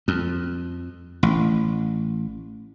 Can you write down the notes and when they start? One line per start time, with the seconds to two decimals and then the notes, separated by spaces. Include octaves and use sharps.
0.08 F2
1.23 A1